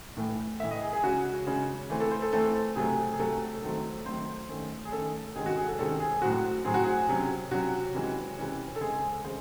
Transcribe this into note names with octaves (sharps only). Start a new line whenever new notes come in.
A2 E3 A3
A2 E3 A3 E5
D#5
G#4
G#4
C#3 G#3 C#4 F#4
C#3 G#3 C#4
E3 A3 C4
A4
C5
A4
E3 A3 C4 A4
C3 F#3 A3 G#4
G#4
C3 F#3 A3 A4
D#3 F#3 A3 C4
D#3 F#3 A3 C4 C5
D#3 A3 C#4
G#4
D#3 A3 C#4 A4
C3 D#3 G#3 C#4 G#4
F#4
G#4
A4
C3 D#3 G#3 C#4 A4
G#4
A2 F#3 C4 F#4
A2 F#3 C4 G#4
F#4
G#4
C3 F#3 C#4
C3 F#3 C#4 F#4
C3 E3 G#3 C#4
C3 E3 G#3 C#4
A4
C#3 G#3 C4 G#4
C#3 G#3 C4 C5